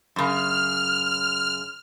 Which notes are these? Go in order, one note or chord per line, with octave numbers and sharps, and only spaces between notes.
F#2 C#3 F6